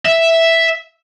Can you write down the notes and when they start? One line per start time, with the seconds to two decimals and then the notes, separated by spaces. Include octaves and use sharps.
0.05 E5